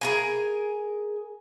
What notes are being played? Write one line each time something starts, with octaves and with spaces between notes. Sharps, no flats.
G#4 A#4 G#5